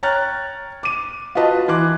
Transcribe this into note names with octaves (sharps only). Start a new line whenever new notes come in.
C#5 G5 A#5 F6 F#6 A6
D6 D#7
F4 F#4 B4 D#5 A5
E3 C6 D6 F#6